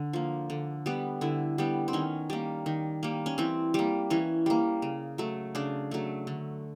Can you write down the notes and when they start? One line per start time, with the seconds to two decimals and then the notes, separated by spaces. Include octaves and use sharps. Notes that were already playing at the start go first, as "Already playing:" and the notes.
Already playing: D3
0.13 F3 A#3
0.50 D3
0.86 G3 B3
1.21 D3 E4
1.58 G3 B3
1.88 C4
1.93 D#3 C#4
2.30 G3 A#3
2.66 D#3
3.03 G3 A#3
3.26 C#4
3.38 E3 C4
3.74 G3 A#3
4.10 E3 C#4
4.46 G3 A#3
4.82 C#3
5.18 F#3 A3
5.55 C#3 D4
5.91 F#3 A3
6.27 D3